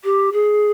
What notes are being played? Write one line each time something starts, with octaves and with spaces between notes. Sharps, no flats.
G4
G#4